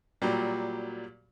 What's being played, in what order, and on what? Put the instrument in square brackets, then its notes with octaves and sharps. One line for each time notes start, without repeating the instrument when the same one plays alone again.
[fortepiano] A#2 F#3 G3